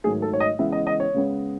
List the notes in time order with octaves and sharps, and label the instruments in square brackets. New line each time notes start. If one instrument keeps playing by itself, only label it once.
[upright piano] G#2 D#3 F#3 A3 G#4
A4
C#5
D#5
C#3 E3 G#3 B3 E5
D#5
D#5
C#5
C#3 G#3 B3